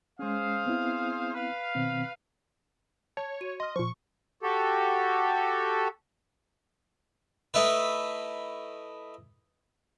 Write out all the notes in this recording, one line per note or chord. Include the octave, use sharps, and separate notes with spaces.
G#3 C#4 G#4 C5 F5
B3 C4 E4
B4 F5
B2 D#3 C4
C#5 A5 G#6
F#4 D#7
D#5 C6 F6
A#2 F3 C#6
F#4 G4 A4
A3 D#4 E4 B4